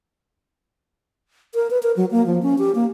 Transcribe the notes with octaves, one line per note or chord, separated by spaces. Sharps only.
A#4
B4
A#4
F#3
A#3
F3
C#4
G4
A#3